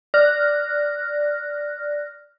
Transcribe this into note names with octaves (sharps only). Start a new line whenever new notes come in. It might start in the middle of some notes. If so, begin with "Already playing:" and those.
D5 F6 F#6 A#6